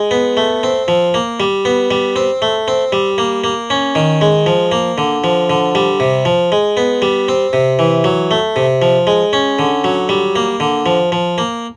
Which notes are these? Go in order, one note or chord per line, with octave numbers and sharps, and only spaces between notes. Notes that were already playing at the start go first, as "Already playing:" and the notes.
Already playing: G#3
B3
A3
C4
F3
A#3
G3
B3
G3
C4
A3
C4
G3
A#3
A#3
C#4
D#3
G#3
F3
A#3
D3
F3
D3
G3
C3
F3
G#3
B3
G3
C4
C3
E3
F#3
A3
C3
F3
G#3
C#4
D3
F#3
G3
A#3
D3
F3
F3
A#3